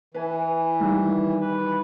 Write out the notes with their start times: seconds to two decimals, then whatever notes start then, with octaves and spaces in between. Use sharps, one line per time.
0.14 E3 B4 G#5
0.80 D#3 G3
1.41 B4